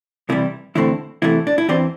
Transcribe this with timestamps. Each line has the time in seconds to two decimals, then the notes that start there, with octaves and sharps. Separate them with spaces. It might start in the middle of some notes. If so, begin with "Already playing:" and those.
0.29 C2 C3 E3 G3 E4
0.75 E2 D3 A3 C4 E4
1.22 E2 C3 E3 A3 E4
1.47 D4
1.58 E4
1.68 E2 E3 C4 D4 G4